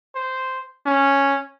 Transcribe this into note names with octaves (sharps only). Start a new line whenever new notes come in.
C5
C#4